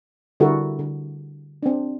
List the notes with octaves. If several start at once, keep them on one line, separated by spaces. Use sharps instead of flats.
D3 G3 E4 F#4 A4 A#4
D3
C4 D4